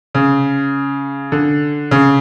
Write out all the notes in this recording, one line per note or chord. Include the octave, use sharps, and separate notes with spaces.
C#3
D3
C#3